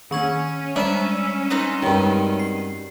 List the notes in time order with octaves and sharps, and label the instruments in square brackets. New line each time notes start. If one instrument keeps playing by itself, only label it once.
[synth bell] D#3 C#6 G#6 [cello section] C#4
[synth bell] G3 G#3 E7 [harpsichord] D4 [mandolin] E5
[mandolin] B3 C4 D#4
[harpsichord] G2 D#3 [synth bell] G#3 F#4
[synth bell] C7